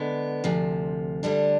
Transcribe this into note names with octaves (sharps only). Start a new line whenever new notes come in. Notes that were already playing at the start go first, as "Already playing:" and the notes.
Already playing: D3 G#3 B3
D2 C3 F3
D2 D3 G3 D4